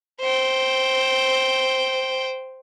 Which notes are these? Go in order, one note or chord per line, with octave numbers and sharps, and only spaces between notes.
C5 G5